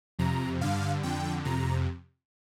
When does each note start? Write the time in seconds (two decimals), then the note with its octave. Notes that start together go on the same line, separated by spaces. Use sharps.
0.19 F2 C3 A#5
0.61 G2 D3 F5
1.03 F2 D3 G5
1.45 F2 C3 A#5